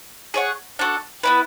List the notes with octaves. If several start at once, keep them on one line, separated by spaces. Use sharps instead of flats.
G#4 C#5 F#5
D4 F#4 A4
B3 E4 B4